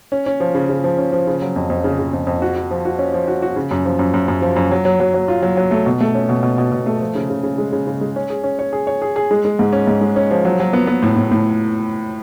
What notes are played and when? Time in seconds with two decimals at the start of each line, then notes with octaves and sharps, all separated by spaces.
0.12 C#4
0.26 C#4
0.40 F3
0.55 C#3
0.69 C#3
0.84 F3
0.98 C#4
1.12 F3
1.27 C#3
1.42 F#3
1.56 F2
1.70 F2
1.84 C#3
1.99 C#3
2.13 F2
2.27 F2
2.42 F#4
2.56 F#4
2.71 F3
2.85 F#4
2.99 C#4
3.13 F3
3.28 F#4
3.42 F#4
3.56 C#3
3.71 F#2
3.86 F3
3.99 F#2
4.14 F#2
4.28 F#2
4.42 F3
4.56 F#2
4.71 F#3
4.85 F#3
5.00 F#3
5.14 F#3
5.28 F4
5.42 F#3
5.57 F#3
5.71 A3
5.86 B2
6.01 A3
6.15 C#4
6.29 B2
6.43 B2
6.58 B2
6.72 B2
6.86 A3
7.00 F3
7.15 C#3
7.30 C#3
7.43 C#3
7.58 G#3
7.72 C#3
7.87 C#3
8.01 G#3
8.16 C#4
8.30 G#4
8.44 C#4
8.59 C#5
8.73 G#4
8.87 C#5
9.02 G#4
9.16 G#4
9.31 G#3
9.45 G#3
9.59 G#2
9.73 C#4
9.87 G#2
10.01 G#3
10.16 C#4
10.31 F3
10.45 F#3
10.60 F#3
10.73 B3
10.87 B3
11.03 A2
11.16 A2
11.32 A2